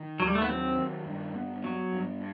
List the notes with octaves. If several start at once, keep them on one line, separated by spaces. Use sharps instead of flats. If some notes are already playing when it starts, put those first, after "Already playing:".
Already playing: D#3
D#2 F#3
G3
A3
B3
F#3 C4
D#3
G2
B3
F#3 B3
G2